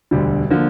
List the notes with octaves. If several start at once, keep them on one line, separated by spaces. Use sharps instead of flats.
E1 D2 D3 G3
D3 F3 A#3